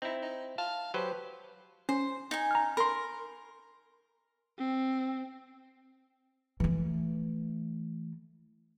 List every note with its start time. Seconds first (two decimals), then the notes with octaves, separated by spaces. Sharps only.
0.02 C4 D#4 E4
0.22 D#4
0.58 F5 A5
0.94 F#3 G4 B4 C5
1.89 C#4 C5
2.31 D#4 G#5
2.51 A#5 F6
2.77 A#4 B5 C6
4.59 C4
6.60 E3 A3